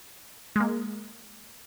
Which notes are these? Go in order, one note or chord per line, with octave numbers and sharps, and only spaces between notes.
G#3
A#3